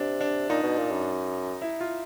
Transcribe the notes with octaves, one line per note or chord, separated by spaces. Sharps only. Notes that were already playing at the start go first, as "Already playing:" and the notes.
Already playing: C3 D4
D4
A#2 D#4
B2
A#2
F#2
E4
F4